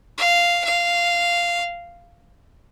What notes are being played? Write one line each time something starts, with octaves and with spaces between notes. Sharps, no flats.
F5
F5